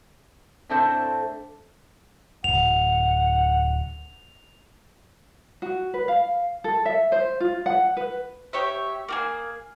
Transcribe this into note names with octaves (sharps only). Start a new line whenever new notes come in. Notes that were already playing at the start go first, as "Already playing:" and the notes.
A2 A3 C4 D4 A4 C5
D1 E2 F#5 F7
F#4
B4
F5
A4
E5
C5
F4
F#5
B4
G4 C#5 E5
A#3 F#4 G#4